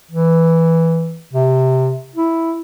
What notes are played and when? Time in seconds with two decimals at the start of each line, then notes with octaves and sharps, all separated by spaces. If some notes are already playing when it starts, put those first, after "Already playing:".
0.11 E3
1.33 C3
2.15 E4